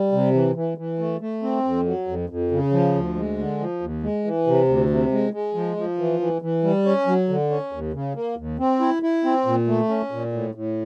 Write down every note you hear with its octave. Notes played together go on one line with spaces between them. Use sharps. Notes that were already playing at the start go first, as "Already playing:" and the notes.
Already playing: G3
C3
E3
E3
E3
A3
A3
C4
F2
F#3
F2
F2
C#3
F3
D2
G#3
D3
F3
D#2
G#3
E3
C3
D2
C3
G#3
G#3
F3
F3
E3
E3
E3
G3
C#4
F#3
D3
C#4
D#2
C#3
A#3
D#2
C4
E4
E4
C4
A#2
A3
C#4
A#2
A2
A2